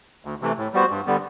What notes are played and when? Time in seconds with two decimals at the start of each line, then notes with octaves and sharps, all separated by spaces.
0.25 D2
0.41 C3 E3 A3
0.58 A2
0.74 G3 B3 F#4 C5
0.91 G2
1.06 D3 G3 B3